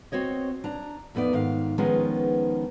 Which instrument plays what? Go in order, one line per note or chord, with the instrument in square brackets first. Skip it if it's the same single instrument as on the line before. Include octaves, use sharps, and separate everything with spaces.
[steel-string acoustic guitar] C4 F#4 C#5 D#5
D4 A#5
F2 A3 B3 D#4 D5
G#2 D#3 F5
D#3 F3 G#3 B3 C#4 D#4